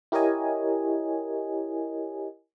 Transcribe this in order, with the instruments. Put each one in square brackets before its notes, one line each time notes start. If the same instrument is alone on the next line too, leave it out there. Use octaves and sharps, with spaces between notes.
[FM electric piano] E4 G4 A#4 C#5 D#5 G#5